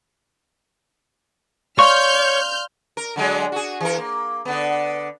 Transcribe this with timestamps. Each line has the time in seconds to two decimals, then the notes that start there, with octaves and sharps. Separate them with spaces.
1.79 C#5 D5 F5 C6 C#6 F6 G6
2.97 A#4
3.16 D3 F#3 G#3
3.52 F#4 G#4
3.80 E3 A#4
3.98 A#3
4.45 D3 B3